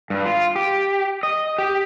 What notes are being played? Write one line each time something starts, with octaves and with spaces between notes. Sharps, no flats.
G2
F4
G4
D#5
G4